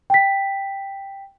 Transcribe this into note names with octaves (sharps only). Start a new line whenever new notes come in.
G5 B6